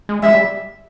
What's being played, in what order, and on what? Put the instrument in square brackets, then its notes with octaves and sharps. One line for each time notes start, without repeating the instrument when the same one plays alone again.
[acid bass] G#3
[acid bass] G#3 [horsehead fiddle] E5
[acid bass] G3